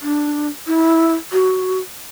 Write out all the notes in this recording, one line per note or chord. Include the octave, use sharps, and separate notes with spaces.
D4
E4
F#4